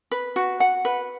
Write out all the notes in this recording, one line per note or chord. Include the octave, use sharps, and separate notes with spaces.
B4
F#4
F#5
B4